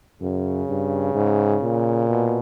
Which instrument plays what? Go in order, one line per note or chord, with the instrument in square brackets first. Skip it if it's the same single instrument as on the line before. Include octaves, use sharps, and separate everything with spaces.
[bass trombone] F#2 [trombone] C#3
[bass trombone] G2
G#2
A#2
[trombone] B2